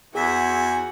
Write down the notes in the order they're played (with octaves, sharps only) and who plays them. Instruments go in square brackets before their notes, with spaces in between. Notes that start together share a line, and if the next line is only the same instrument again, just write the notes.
[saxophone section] E2 [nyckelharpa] F#4 F#5 [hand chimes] G#4 B6 [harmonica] E5 G#5